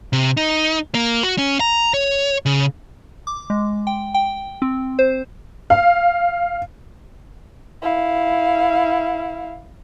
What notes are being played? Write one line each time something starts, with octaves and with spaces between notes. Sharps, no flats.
C3
D#4
A#3
F#4
C#4
A#5
C#5
C#3
D6
G#3
G5
G5
C4
C5
F5
E4 F5